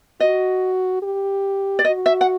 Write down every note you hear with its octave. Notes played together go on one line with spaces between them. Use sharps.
F#4 D#5
G4
D5
F#4 D#5
E5
F#5